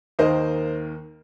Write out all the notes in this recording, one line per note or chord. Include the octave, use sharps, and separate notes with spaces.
D#2 D#3 A#3 C5 D#5